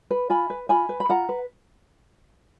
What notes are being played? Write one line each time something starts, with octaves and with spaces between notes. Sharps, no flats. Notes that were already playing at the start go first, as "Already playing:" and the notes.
B4
F4 G#5 B5
B4
F4 G#5 B5
B4
B5
F4 F#5 A#5
B4